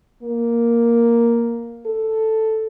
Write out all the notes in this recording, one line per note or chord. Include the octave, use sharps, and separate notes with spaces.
A#3
A4